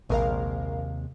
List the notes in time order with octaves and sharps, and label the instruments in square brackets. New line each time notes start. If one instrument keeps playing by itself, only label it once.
[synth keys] A#1 A#4 F5 [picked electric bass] D#2 C3 G#3